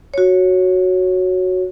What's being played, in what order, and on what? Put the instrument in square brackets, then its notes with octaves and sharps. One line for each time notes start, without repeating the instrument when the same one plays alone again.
[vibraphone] F#4 C#5